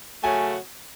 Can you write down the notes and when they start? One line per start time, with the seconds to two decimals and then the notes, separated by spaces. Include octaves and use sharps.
0.23 C#3 F#3 A3 C#4 F#4 G#5